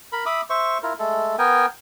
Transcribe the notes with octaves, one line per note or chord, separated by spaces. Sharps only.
A#4 B5
E5 B5 D6 D#6
C5 E5 C#6
E4 F4 A#4
G#3 A3 A4
B3 A#4 G5 G#5